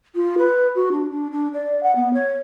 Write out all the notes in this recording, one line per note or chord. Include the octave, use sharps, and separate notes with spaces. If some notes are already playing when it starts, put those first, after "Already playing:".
F4
B4
F#4
D4
D4
D4
D5
F#5
B3
C#5